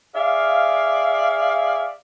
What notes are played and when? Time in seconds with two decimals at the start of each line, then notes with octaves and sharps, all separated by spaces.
0.14 G#4 D5 E5 F5